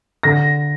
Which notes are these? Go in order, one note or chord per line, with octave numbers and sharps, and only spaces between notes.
D3 A#6